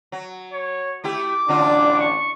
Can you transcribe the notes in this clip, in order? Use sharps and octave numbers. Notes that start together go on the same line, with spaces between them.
F#3
C#5
A3 E4 G4 D6
A1 D3 F#3 D4 F4
C#6